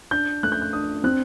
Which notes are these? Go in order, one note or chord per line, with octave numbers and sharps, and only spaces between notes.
D4 G6
A3 F#6
G6
F#6
D4 D#6
C4 F#6